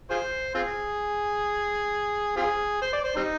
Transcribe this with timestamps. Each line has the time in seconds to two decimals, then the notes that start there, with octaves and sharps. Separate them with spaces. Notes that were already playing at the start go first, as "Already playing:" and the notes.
0.10 F4 G#4 C5
0.55 C4 F4 G#4
2.36 C4 F4 G#4
2.82 C5
2.92 D5
3.04 C5
3.16 G3 C4 D#4